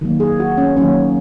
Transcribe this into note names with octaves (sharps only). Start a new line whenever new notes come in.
D#3 F#3 A#3
G#4
F#4
C#4
D#3 F#3 A#3 C#4